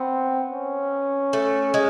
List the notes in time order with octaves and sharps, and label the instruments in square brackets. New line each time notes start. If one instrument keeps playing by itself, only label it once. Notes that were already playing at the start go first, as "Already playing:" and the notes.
Already playing: [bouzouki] B3 [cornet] C4
[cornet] C#4
[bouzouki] A3
G#3